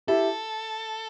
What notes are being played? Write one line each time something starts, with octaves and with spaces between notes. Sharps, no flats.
E4 G4 A4